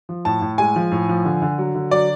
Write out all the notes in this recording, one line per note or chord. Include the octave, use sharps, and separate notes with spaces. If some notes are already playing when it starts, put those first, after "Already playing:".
F3
A2 A5
A2
G#3 G#5
F3
A2
F3
D3
D3
F#3
D3
F#3 D5